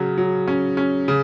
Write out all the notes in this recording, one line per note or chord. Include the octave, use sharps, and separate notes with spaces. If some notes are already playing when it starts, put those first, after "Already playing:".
Already playing: C#3 F#3 C#4
F#3
C#4
C#4
C#3